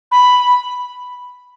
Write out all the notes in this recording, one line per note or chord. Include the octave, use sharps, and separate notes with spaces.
B5